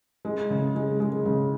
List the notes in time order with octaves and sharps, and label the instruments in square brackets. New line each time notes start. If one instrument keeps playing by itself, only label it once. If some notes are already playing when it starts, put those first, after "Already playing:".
[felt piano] G#3
C#3
G#3
G#3
C#3